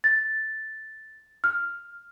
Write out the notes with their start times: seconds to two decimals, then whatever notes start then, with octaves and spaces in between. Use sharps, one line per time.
0.04 A6
1.44 F6